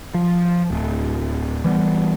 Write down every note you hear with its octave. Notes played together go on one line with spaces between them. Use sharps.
F3
D1
E3 G3 B3